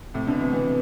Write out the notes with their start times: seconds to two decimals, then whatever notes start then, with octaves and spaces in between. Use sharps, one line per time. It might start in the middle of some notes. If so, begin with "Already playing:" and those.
0.14 A2 C3
0.27 B2 D3
0.40 C3 E3
0.53 C3 E3